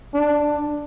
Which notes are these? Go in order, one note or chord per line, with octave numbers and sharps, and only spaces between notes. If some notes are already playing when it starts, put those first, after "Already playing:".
D4